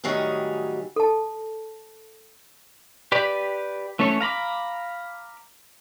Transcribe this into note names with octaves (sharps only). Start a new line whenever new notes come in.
A2 D#3 F#3 G3 C#4 G#4
A4 A5
G4 B4 D5
E3 A3 C#4 A4 C#5
F5 A#5 B5 D6